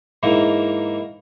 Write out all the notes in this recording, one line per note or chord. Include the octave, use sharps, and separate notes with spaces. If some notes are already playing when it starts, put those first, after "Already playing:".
G#2 E3 A#3